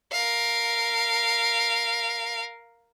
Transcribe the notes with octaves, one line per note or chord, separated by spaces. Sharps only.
A#4 F5